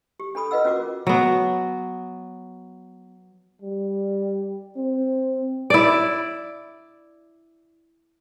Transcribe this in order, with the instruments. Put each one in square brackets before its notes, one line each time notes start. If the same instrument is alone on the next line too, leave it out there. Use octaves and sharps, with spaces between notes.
[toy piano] G4
D4 A4 B5 D#6
F4 B4 D#5 F#5 E6
C#4 F4 F#4 A#4 D6
[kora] F#3 B3
[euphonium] G3
C4
[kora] E4 D5